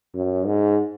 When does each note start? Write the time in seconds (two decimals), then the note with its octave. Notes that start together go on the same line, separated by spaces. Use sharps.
0.15 F#2
0.46 G#2